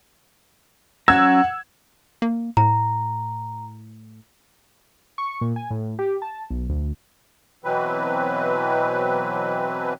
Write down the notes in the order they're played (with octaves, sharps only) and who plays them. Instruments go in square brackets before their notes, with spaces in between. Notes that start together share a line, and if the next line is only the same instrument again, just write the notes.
[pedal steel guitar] F#3 C#4 A#5 [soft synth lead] F#5 [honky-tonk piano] E6 G#6
[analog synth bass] A#3
[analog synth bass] A2 [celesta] A#5
[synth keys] C#6
A#2
G#5
A2
G4
A5
B1
D2
[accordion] B2 E3 F#3 C4 B4